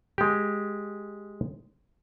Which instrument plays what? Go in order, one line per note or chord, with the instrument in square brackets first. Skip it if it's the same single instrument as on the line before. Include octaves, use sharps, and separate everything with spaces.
[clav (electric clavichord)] G#3 G4